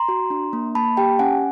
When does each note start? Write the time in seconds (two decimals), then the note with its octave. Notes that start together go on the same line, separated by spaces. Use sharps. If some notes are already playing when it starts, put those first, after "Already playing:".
Already playing: A#5 C6
0.09 F#4
0.30 D4
0.53 A#3
0.75 A#3 A5 B5
0.97 G4 G5 A5
1.19 C#4 F#5 G#5